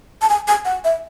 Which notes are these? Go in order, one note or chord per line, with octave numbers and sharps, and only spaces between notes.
A5
G#5
G#5
F#5
E5